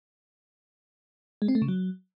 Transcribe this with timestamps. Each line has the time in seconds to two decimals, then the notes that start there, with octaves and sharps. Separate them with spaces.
1.42 G#3
1.48 C4
1.55 A3
1.62 C#3
1.68 F#3